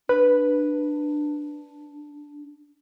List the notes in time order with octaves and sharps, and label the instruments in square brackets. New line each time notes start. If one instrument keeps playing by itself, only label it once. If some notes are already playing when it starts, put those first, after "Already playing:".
[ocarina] D4 [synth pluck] B4